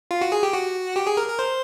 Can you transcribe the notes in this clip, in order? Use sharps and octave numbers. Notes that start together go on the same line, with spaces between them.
F4
F#4
G#4
G4
F#4
G4
G#4
A#4
A#4
C5